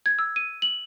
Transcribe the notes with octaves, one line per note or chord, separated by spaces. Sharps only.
G#6
E6
D#7
F#7